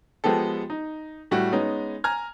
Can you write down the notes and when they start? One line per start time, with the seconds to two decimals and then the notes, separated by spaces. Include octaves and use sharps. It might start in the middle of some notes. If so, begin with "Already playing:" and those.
0.24 F3 G#3 B3 G4 A4
0.70 D#4
1.31 A2 G3 A3 F#4
1.52 G#3 B3 C#4 D#4
2.04 G#5 A#5 F6 G#6